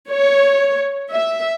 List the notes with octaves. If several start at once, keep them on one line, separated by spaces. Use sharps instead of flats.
C#5
E5